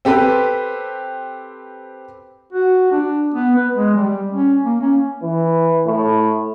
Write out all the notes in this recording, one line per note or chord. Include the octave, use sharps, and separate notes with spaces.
C4 G4 A4 B4
F#4
D4
B3
B4
G#3
G3
C#4
A#3
C#4
E3
A2